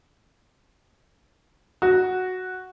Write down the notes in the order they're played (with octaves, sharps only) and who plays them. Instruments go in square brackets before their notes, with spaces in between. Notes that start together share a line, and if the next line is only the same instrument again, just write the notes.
[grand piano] F#4